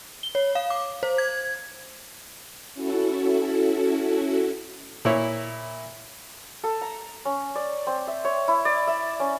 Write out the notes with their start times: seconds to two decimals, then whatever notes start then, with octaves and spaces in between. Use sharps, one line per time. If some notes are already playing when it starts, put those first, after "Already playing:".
0.23 G7
0.35 C#5
0.55 F5
0.70 D6
1.03 C5
1.18 G#6
2.74 C#4 E4 F#4 A4
5.05 A#2 E4 C#5
6.64 A4
6.81 A#5
7.25 C#4
7.56 D5
7.87 C4
8.07 E5
8.25 C#5
8.48 E4
8.65 D5
8.87 E5
9.20 C#4